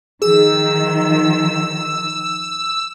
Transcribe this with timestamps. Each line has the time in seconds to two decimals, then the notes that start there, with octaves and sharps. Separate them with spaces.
0.22 D#3 F3 G#4 E6